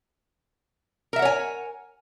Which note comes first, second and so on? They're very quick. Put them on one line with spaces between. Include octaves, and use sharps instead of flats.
A#4 E5 F#5 C#5 G#5